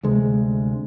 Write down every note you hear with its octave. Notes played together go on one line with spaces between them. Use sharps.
D2 C3 G#3